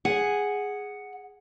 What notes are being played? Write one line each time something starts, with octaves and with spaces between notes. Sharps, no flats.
G#4 F#5